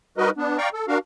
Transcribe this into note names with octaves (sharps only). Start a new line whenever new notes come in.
G3 D#4 F#4 A#4 B4 D#5
B3 D4
D5 F5 G5 A#5 C#6
A4
D4 F#4 A#4 F5